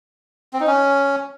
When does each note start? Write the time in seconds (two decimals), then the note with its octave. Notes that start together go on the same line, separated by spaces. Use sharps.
0.53 C4
0.60 D#4
0.67 C#4